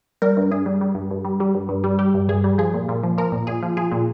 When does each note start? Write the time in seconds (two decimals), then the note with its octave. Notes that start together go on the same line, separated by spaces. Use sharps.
0.22 G3 A#4
0.37 G2
0.51 G2 G#4
0.66 G3
0.81 G3
0.95 G2
1.11 G2
1.25 G3
1.40 G3
1.55 G2
1.69 G2
1.84 G3
1.99 G3 G4
2.14 G2
2.29 G2 G#4
2.44 G3
2.58 F3 G#4
2.74 A#2
2.89 A#2
3.03 F3
3.18 F3 A#4
3.32 A#2
3.47 A#2 G#4
3.63 F3
3.77 F3 G#4
3.92 A#2